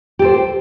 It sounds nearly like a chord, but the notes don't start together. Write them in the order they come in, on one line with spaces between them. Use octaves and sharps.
G4 A4 C5